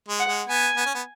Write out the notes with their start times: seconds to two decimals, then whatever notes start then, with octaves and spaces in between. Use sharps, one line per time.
0.09 G#3
0.19 F#5
0.28 G#3
0.48 B3 G#5
0.77 B3
0.86 C#4
0.95 B3